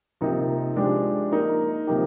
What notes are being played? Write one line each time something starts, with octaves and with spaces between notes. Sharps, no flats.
C3 F3 A#3 D#4
F3 G#3 D4 G4
A#3 D#4 A#4
C3 F3 A#3 D#4 G4